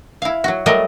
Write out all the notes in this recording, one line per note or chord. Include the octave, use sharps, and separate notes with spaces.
E4 F5
F#3 F#4
F#3 G3 A3 A#4 D#5